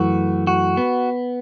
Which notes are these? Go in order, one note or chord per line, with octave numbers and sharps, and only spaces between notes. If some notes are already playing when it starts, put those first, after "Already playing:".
Already playing: F#2 E3 A3 F#4
F#4
B3